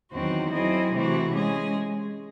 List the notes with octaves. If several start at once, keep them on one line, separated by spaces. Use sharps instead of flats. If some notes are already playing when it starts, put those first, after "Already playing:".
E2 D#3 F#3 C4 F#4
F#3 C4 E4 G#4 D#5
C3 E3 A3 C4 F#4
G#3 C#4 G#4